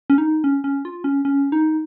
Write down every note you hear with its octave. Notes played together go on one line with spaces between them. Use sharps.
C#4
D#4
C#4
C#4
F4
C#4
C#4
D#4